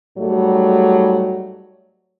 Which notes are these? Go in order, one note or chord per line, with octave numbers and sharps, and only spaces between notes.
G#2 F#3 G3 A3